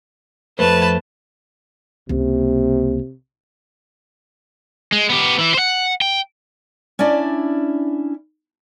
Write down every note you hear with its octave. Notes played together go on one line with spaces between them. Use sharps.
F2 A3 B4 C5 A5
C#2 C3 A#3
G#3
B3 G4
E3 E4
C5 F#5
G5
C#4 D4 E4 D5